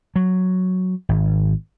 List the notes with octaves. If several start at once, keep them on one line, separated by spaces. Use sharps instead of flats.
F#3
G#1